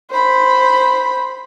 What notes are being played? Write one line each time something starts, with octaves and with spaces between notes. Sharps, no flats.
C5 B5